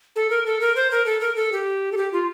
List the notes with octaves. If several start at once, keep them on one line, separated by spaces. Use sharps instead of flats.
A4
A#4
A4
A#4
C5
A#4
A4
A#4
A4
G4
A4
G4
F4